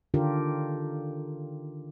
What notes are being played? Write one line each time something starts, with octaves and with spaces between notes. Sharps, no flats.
D3 D#3 D4 F4 G4 A#4